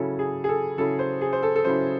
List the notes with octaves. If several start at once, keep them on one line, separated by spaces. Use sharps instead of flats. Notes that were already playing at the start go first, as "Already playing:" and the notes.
Already playing: C#3 F#3 C#4 E4 A4
G#4
G#4
A4
C#3 F#3 C#4 E4 A4
C5
G#4
C5
A4
A4
C#3 F#3 C#4 E4 C5